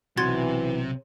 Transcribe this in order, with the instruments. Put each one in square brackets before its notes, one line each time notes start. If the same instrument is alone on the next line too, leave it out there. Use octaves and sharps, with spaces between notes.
[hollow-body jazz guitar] B1 F#4 [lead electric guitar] C3 [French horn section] E3 [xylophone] C6 G#6 A6